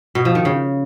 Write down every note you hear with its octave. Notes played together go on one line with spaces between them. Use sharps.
B2
F3
D#3
C#3